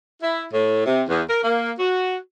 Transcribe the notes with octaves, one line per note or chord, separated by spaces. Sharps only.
E4
A2
C3
E2
A#4
A#3
F#4